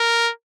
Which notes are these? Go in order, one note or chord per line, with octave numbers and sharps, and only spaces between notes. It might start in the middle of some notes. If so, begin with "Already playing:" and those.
Already playing: A#4